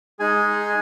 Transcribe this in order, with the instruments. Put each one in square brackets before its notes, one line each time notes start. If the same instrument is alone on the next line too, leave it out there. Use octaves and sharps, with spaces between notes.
[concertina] G#3 D#4 G#4 G#5